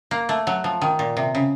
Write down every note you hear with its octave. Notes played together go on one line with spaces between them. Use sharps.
A#3
A3
F#3
F3
D#3
A#2
C3
C#3